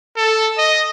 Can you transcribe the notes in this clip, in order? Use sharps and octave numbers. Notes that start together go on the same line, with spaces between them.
A4
D#5